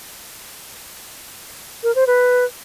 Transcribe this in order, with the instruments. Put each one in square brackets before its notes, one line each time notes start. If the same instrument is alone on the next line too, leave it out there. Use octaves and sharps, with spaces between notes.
[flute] A#4
C5
B4